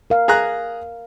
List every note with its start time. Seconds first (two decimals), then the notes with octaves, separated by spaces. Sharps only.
0.10 A#4 F5
0.28 G#4 A#5 F#6